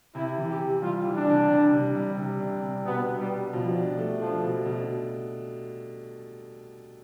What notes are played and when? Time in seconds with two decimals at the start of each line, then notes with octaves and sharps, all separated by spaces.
0.15 C3 E4
0.38 E3
0.49 G4
0.60 E3
0.82 G3 F4
1.05 E3
1.17 D4
1.27 C3
1.50 G3
1.73 C3
1.96 G3
2.18 C3
2.40 D4
2.62 C3
2.85 B2 B3
3.08 D4
3.19 G3
3.30 D4
3.52 B2 F3
3.76 D4
3.98 A3
4.20 F3 D4
4.43 B2
4.65 B2